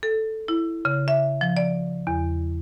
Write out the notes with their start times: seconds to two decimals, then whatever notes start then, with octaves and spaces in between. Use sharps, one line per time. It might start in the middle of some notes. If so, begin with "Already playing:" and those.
0.03 A4
0.48 E4
0.85 C#3
1.08 E5
1.41 F3
1.57 D5
2.07 E2